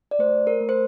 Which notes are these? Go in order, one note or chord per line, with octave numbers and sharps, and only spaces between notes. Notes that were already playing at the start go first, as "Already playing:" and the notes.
D5
A3 C5
A#4
A3
C5